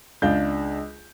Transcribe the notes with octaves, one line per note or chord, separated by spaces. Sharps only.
C#2 D4 F5 G6